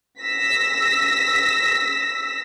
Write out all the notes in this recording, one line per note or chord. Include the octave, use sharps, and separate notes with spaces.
E6 A#6 B6